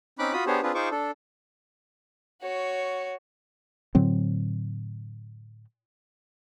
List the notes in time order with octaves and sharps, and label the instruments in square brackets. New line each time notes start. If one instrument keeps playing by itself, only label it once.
[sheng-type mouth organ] C4 C#4 D#4 B5 D6 F#6
F4 F#4 B5 D#6
B3 D4 G4 G#4 C5 C#5
C4 D4 F4 G#4 B4
D#4 F4 G#4 C5 C#6 D6
D4 A4
[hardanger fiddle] F#4 C#5
[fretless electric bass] A2 D3 F#3 C4